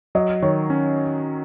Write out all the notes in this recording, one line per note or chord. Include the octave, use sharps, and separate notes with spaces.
F#3 D#5
D#3 C#5
C#4